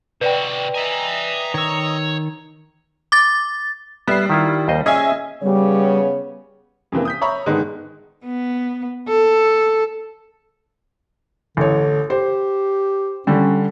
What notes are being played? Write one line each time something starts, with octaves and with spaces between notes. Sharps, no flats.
C3 F#4 B4 D5 G5
D#5 E5 G#5 A#5 D#6
D#3 C#5 E6
D6 A6
G3 B3 E5 C7
D#3 E4 F4
D#2 C5 D#5
C#4 G#4 D#5 E5 G#5
C#3 G3 B3 C#5
F2 C3 E3 A#3
D#6 G6 B6
C#5 E5 A#5 B5 C#6
G#2 D3 D#3 G#3 B3 D#4
B3
A4
A1 D3 C#5
G4 C5
D3 G3 C#4